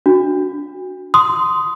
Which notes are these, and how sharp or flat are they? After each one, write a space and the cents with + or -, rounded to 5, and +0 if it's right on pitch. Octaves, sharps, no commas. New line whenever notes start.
D4 +0 F#4 +0
C6 -15 D#6 +5